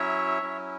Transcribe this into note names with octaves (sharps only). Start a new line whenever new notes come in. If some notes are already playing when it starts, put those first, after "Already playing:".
Already playing: F#3 C#4 E4 C#5 E5
F#3 C#4 E4